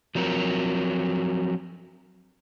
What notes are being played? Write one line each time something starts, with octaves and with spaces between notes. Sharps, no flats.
F3 F#3 C4 A#4